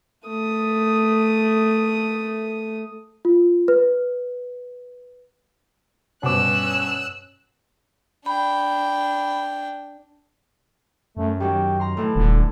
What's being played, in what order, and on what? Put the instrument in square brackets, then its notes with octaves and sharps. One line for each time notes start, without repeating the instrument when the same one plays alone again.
[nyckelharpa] A3 D#6
[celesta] F4
B4
[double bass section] G2 [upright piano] B2 C5 D6 [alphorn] C#4 [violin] E6 F#6
[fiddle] D4 G5 [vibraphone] B5
[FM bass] F#2 [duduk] A3
[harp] D#3 F#3 D#4 [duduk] G4
[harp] A#5 C6
[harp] A2 E3 E4 [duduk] A4
[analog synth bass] D#1 [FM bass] D3